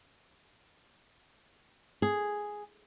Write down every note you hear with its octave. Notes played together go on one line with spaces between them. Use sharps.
G#4